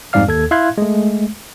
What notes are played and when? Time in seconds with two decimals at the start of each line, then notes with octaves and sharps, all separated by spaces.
0.13 F2 G#2 G3 D5 F5 F6
0.27 D#2 A4 G#6
0.51 E4 E5 F5 C6 F#6 G#6
0.78 G#3 A3